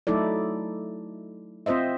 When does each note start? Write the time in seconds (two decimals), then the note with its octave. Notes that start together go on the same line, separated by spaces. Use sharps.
0.07 F#3 A3 D#4 E4 A4 D5
1.66 C4 F4 C5 D#5 E5